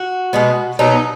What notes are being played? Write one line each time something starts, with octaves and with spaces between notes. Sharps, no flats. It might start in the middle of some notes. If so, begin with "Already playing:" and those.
Already playing: F#4
B2 G#3 B3
B2 F#3 B3 D#4